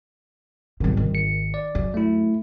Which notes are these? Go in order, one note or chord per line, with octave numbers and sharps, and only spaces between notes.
G#1 B2 D#3 G3 C4
D#3
G#1 C#7
D5
F#2
A3 E4